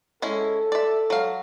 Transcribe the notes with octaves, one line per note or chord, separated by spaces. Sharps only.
G#3 C#4 E4 A4
D5 E5
F#3 F5